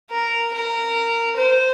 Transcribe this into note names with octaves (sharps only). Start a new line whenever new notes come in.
A#4
A#4
C5